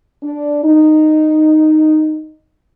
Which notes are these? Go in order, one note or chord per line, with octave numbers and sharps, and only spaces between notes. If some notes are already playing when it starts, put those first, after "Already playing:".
D4
D#4